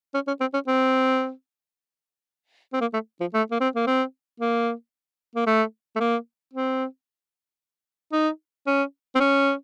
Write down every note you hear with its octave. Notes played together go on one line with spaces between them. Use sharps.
C#4
C#4
C4
C#4
C4
C4
A#3
A3
F3
A3
A#3
C4
A#3
C4
A#3
A#3
A3
A3
A#3
C4
D#4
C#4
C4
C#4